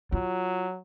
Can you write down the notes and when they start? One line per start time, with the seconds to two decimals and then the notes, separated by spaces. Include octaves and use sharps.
0.12 F#3 F4